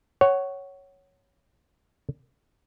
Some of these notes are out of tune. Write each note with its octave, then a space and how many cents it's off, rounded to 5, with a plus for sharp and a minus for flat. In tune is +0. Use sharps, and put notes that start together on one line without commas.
C#5 +0 F#5 +20